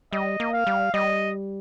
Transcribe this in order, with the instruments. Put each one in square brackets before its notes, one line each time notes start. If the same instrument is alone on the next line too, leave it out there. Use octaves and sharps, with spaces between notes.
[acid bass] G3 [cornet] D#5
[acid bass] A#3
[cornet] F5
[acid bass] G3
[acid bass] G3 [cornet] D#5